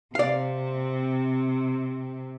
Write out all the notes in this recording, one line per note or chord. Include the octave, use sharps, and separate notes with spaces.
C3 C4 D5 F5